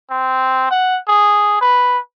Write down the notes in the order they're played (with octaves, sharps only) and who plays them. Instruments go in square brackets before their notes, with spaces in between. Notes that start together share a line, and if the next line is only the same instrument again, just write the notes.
[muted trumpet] C4
F#5
G#4
B4